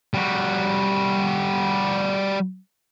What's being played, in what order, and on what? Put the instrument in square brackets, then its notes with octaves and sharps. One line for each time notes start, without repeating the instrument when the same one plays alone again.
[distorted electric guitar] G3 F#4